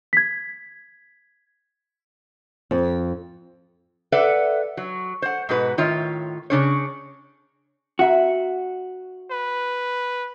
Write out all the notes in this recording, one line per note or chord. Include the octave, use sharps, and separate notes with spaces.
G#6 B6
F2
A4 B4 D5 E5 F#5
F#3
C5 F#5
G#2 B2 F#4 B4
A2 D#3 F4 C#5 E5
C#3 D4 C#5
C4 F#4 E5 A#5
B4